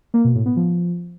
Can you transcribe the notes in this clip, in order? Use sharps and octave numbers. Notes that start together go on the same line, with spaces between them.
A#3
B2
A2
B3
F3